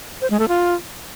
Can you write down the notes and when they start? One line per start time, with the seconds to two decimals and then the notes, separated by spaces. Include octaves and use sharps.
0.21 C5
0.30 G#3
0.39 A3
0.48 F4